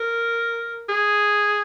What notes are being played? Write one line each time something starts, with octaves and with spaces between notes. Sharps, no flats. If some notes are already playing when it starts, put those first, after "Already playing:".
Already playing: A#4
G#4